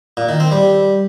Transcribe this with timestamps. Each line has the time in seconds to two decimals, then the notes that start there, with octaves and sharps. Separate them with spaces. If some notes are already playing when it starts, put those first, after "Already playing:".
0.17 A#2
0.29 D#3
0.40 C4
0.52 G3